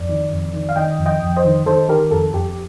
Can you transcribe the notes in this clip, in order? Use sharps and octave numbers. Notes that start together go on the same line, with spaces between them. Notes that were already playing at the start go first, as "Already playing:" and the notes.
Already playing: F2 D5
D#3
F2
D#3
F5
D#3 D#5 G5
F2
D#5 G5
F2
C5 D#5
D#3
D#3 A4 C5
D#3 G4 A#4
F2 A4
F2 G4